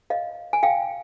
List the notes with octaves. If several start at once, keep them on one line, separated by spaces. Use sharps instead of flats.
D#5 F5
G#5
F5 G5